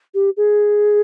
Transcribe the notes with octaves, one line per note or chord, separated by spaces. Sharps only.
G4
G#4